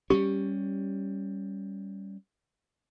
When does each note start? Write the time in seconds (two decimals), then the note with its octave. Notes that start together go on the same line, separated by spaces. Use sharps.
0.10 G3 G#3 C#4 G4